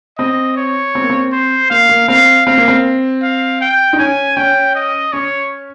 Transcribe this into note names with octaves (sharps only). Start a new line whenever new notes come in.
C4 D#5
C#5
C4
A#3
C4
C5
A#3 F5
A#3
C4 F5
C4 F5
A#3
C4
F5
G5
D#4
C#4 G#5
C#4 G5
D#5
C#4 C#5